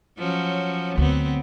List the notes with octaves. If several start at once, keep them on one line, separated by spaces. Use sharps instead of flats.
F3 F#3 C#4
D2 F#3 B3 C4